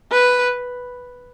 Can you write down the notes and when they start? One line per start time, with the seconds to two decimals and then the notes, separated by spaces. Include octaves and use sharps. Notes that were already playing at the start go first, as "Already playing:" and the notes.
0.11 B4